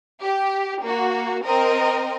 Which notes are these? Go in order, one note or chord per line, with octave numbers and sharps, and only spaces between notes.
G4
A#3 F#4
C4 A#4 D#5